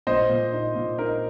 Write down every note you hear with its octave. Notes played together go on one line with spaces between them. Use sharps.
A#2 C5 D#5
A#2
D#4
A#2
D#4 A#4